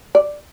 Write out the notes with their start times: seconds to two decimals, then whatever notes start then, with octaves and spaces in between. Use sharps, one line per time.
0.15 D5